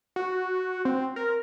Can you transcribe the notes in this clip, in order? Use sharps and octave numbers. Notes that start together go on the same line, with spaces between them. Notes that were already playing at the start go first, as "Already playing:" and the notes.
F#4
C4
A#4